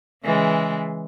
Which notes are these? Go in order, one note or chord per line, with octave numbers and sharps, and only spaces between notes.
C#3 E3 G#3